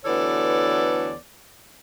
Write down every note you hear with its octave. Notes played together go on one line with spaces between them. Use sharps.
D2 E3 B3 A4 C#5 D5